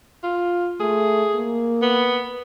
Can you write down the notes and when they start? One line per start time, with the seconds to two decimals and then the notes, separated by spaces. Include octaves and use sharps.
0.23 F4
0.80 A3 G#4
1.35 A#3
1.82 B3